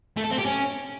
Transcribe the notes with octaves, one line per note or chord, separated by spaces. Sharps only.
A3
A4
C4
G4
C#4